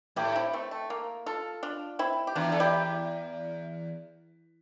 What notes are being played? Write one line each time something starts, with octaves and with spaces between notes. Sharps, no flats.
A2 E4 G4
C4 E4
A3 C4
A3
A#3
F4 A4
D4 F4
C4 E4
G4
E2 D4 F4
A4
E4 G4